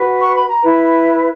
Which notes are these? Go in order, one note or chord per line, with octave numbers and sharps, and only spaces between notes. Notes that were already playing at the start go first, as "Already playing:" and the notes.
Already playing: F#4 B4
C#6
B5
A#5
E4 B4